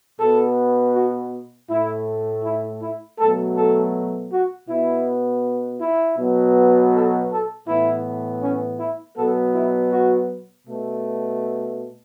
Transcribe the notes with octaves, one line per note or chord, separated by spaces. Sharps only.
B2 B3 A4
F#4
A2 A3 E4
E4
E4
B2 F#3 A3 A4
A4
F#4
B2 B3 E4
E4
B2 F#3 B3
A4
A4
A2 E3 B3 E4
C#4
E4
B2 F#3 B3 A4
E4
F#4
B2 A3